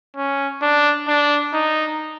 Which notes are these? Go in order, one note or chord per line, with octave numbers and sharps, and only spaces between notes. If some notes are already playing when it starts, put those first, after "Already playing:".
C#4
D4
D4
D#4